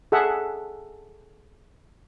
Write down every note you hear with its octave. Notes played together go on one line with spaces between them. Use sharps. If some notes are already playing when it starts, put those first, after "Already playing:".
G#4 A4 E5 F#5